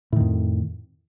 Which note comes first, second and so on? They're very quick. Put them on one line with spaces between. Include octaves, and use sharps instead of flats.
A2 D#3 F2